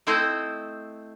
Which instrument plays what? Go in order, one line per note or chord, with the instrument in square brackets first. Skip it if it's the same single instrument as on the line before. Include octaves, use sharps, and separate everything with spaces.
[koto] A3 C4 E4 C5 D#5